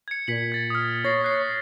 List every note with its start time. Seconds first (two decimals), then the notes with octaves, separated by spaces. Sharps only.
0.08 G#6 C#7
0.28 A#2 B6 C#7 F#7
0.52 G#6 A6
0.70 D#6 F6
1.05 C#5 A6 A#6 C7
1.24 F#6 C7